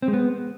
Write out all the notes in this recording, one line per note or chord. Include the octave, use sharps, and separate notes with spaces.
C4
G#3
B3